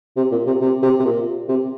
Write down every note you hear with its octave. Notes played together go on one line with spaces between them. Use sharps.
C3
A#2
C3
C3
C3
C3
A#2
C3